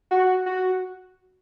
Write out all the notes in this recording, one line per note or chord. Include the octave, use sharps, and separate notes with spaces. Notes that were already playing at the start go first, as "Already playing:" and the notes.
F#4
F#4